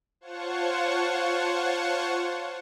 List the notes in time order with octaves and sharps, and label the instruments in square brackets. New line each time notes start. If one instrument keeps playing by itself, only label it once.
[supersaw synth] F4 C5 C#5 F#5 A5 C#6